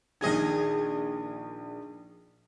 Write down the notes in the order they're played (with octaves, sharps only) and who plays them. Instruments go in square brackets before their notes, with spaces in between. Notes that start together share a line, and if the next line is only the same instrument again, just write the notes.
[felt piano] A#1 D#3 G#6 [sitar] D#4 G#4 D#5